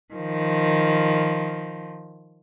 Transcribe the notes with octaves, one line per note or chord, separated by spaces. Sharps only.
D#3 F3